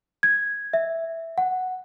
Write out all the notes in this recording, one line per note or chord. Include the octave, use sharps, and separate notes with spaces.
G#6
E5
F#5